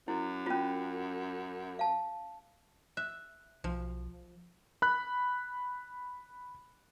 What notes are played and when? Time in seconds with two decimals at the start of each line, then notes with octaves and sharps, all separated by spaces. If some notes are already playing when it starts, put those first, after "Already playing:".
0.08 F#2 E4
0.46 C#4 F4
1.79 F5 A5
2.97 E5 F#6
3.64 B1 F3
4.82 B5 F#6